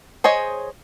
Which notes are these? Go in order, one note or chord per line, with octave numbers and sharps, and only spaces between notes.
G#4 C5 C#5 D#5